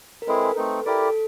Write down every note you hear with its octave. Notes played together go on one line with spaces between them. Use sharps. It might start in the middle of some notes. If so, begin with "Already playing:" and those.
A#4
G#3 C4 E4 G#4 A4 B4
A3 C4 D#4
E4 G4 A4 A#4 D5
A4